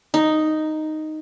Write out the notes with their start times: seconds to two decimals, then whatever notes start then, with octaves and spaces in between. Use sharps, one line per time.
0.14 D#4